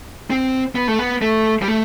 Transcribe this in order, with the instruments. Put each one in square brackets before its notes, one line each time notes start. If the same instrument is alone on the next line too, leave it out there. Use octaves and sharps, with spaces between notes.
[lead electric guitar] C4
B3
A3
B3
A3
G3
A3